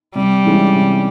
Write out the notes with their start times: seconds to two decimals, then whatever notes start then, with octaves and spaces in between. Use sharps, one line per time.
0.15 C3 G3
0.45 E3 G#3 C#4
0.74 C3